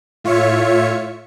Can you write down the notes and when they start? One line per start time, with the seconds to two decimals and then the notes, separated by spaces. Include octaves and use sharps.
0.24 A2 F4 C#5 E5 C#7